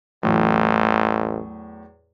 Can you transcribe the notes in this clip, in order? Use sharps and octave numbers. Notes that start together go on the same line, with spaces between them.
A1 E2 A2 F#3